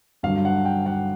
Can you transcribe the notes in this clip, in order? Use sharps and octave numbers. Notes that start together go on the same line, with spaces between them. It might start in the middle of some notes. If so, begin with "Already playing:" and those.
G2 D3 F#3 F5
F#5
G5
F#5